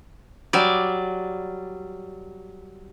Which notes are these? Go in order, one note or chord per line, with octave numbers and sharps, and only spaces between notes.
F#3 G3 D5